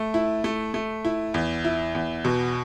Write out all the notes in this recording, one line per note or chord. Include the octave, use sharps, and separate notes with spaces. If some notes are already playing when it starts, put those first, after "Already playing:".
Already playing: A3
E4
A3
A3
E4
E2
E4
E2
B2